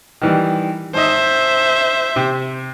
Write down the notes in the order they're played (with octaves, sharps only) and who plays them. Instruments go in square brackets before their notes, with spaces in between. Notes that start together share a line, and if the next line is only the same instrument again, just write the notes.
[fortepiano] D#3 E3 G3
[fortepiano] G#1 D#5 [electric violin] C5 E5
[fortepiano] C3